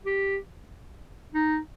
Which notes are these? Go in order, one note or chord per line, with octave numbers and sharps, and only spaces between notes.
G4
D#4